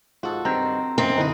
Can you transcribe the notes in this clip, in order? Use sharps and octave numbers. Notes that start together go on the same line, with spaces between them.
G#2 F4 F#4 A4
G2 D#3 C4 G5 A#5
F#2 D#3 E3 A#3 C4
D3 D#4 E4 B4 D#5